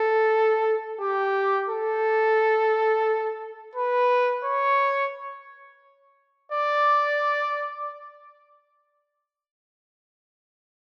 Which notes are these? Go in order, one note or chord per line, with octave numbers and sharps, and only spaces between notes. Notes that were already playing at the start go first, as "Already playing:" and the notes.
Already playing: A4
G4
A4
B4
C#5
D5